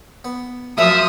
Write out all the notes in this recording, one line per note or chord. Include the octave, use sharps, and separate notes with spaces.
B3
F#2 F3 A3 E5 D#6